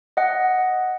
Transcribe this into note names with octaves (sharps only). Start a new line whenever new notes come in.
D#5 F#5